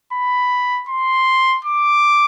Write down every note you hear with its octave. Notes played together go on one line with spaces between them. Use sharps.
B5
C6
D6